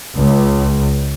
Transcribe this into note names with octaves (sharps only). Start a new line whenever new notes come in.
C#2